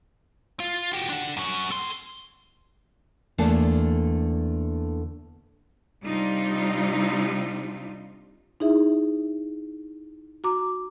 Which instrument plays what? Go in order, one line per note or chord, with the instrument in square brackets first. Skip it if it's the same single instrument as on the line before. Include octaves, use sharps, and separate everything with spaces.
[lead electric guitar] F4
F#4 G4
D4 F#5
F#2 F#4
A4 C6
[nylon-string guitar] E2 D3 A3 A#3 A5
[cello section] C3 G3 D4 D#4 F4
[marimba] D#4 E4 G#4 E5
F#4 A#5 D6